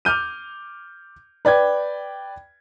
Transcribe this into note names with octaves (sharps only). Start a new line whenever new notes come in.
D6 F6 G6 D#7
B4 D5 G5 G#6